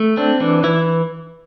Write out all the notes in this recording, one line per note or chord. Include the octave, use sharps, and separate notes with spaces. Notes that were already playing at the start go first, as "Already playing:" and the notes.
Already playing: A3
C4 D4
E3 D4
E3 E4